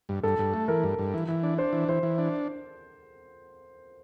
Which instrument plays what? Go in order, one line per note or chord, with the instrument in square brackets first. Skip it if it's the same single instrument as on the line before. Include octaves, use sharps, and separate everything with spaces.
[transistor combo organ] G2
[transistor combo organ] G2 [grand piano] A4
[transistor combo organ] G2
A3
[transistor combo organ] E3 [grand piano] A#4
[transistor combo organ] G2
G2
E3
E3
D4
[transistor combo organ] D4 [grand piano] C5
[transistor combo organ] E3
[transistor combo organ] E3 [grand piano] C5
[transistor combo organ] E3
D4